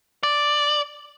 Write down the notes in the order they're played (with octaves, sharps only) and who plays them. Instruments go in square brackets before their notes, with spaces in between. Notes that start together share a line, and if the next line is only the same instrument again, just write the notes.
[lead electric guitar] D5